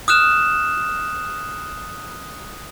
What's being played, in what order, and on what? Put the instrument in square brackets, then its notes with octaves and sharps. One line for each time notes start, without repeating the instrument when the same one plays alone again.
[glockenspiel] D#6 F6 F#6 E7